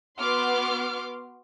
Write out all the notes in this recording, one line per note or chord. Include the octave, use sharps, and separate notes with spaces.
B3 F#4 C6 D6 F6